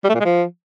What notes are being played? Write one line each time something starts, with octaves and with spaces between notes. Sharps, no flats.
G3
A3
A#2
G#3
F3